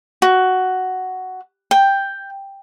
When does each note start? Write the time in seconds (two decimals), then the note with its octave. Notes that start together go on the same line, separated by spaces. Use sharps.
0.22 F#4
1.71 G5